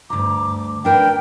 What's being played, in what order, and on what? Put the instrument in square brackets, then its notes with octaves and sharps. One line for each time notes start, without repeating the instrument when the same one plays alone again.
[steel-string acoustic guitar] D2 G2 A#5 [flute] D6
[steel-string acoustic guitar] D4 A#4 B4 [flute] G5